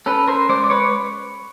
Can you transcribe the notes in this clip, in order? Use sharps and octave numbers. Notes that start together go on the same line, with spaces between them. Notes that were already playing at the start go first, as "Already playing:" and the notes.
C#4 A4 B4
A#4 C5
G#3 C5 D5
D5
B4 C#5